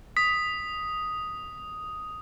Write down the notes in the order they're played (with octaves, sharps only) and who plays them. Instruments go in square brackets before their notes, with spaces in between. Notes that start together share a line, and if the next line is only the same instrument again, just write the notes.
[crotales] D#6 [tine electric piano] B6